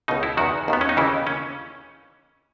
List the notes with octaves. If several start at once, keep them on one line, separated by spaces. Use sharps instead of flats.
C#2 B2 D#4
E4
E2 D#3 F#4
D#2 D#3 B3
C#4
D#4
D#2 C#3 E3 E4
C#4